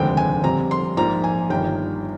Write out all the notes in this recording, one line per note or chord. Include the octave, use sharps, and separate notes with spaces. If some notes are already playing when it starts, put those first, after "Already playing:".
Already playing: F1 D#2 D3 G#3 C4 G5
G#5
F2 D3 G3 C4 A#5
C6
A#1 G#2 F3 A#3 A#5
G#5
G1 G2 D#3 G5